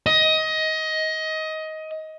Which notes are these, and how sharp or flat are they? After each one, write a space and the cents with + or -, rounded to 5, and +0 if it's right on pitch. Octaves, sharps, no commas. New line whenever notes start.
D#5 +20